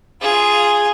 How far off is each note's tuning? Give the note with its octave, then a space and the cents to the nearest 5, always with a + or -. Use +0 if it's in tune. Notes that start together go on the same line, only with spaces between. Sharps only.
F4 +0 G#4 +0